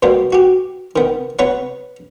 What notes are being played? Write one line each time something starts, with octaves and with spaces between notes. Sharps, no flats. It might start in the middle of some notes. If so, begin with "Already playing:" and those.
B2 G3 A#3 B3
F#4 G4
D#3 B3
B3 B4 C#5 F#5